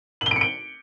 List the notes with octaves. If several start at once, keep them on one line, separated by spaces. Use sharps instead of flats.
F#7
G7
D7
C#7
D7